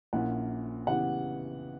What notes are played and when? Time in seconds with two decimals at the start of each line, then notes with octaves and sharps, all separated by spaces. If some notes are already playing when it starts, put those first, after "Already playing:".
0.13 A#1 A#2 A#3 C#4 E4 F#5
0.87 C#3 E3 B3 E4 G4 F#5